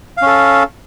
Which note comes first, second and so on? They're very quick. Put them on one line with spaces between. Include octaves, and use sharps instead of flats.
F5 C#4 A4